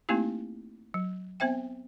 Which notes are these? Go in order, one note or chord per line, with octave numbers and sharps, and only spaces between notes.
A3 A#3 C4 D#4 E4 G4
F#3
B3 C4 C5 E5 G5